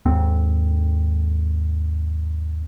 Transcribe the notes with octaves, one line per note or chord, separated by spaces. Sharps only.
D#2 G#2 C4